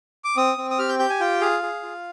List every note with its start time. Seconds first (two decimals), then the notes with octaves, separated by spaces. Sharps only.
0.24 D6
0.37 C4 D#6
0.58 C4
0.71 D#6
0.79 G4 F6
0.89 G6
0.99 G4 G6
1.10 G#5
1.20 F4 G5
1.41 G#4 F5
1.63 G#4
1.83 F4